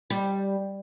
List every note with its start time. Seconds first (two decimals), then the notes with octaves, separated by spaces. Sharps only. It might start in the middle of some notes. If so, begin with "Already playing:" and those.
0.10 G3